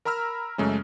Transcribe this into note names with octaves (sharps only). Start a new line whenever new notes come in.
A#4 A#5 B5 E6 F6
F#2 C#3 G#3 A3 C#4